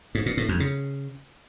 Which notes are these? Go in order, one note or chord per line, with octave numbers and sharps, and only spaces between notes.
G#2
A#2
A2
F2
C#3